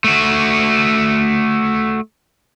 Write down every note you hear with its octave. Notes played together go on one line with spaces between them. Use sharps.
A3 F#4